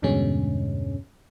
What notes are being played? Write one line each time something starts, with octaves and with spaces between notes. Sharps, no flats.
E2 G2 B2 D3 G#3 C#4